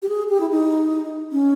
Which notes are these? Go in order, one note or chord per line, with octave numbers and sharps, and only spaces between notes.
G4
G#4
G4
E4
D#4
C#4